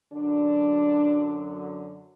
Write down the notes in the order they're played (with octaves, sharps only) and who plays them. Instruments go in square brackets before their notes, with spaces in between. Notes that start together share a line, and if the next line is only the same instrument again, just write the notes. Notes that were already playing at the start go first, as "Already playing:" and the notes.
[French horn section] F#2 D3 F#3 D4